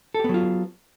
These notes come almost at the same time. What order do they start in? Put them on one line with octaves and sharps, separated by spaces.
A4 G4 B3 F#3 F4